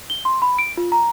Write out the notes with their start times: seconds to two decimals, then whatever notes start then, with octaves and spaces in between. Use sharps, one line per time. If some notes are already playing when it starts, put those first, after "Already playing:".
0.10 G7
0.25 C6
0.42 B5
0.59 D7
0.77 F4
0.92 A#5